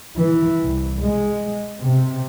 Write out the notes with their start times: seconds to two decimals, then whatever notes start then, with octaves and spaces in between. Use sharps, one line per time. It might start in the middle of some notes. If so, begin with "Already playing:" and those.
0.17 E3
0.62 C2
1.00 G#3
1.81 C3